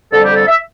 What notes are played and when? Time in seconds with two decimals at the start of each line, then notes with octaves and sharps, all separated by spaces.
0.11 F2 D3 G3 A4
0.23 G4
0.35 A4
0.47 E5